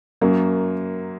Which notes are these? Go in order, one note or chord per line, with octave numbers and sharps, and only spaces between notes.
F#2 F#3 A#3